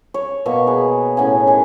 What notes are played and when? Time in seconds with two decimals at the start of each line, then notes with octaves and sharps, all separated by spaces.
0.14 C#5
0.46 B2 A#3 C#6
0.67 G#4 B4
1.17 A2 C#4 F#5 G#5
1.47 D#3 G#5